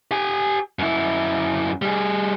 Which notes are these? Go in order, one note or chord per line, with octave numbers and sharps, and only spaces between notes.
G4 G#5
F#2 E4
G3 G#4